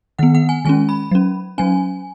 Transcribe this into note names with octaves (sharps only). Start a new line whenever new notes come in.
D#3 B3 F#5
F#5
G#5
D#3 G#3 C#4 G#5
B5
F#3 C#4
F#3 C#4 G#5